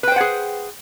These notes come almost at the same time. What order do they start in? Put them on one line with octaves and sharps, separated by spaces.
B4 G5 C5 F#5 G#4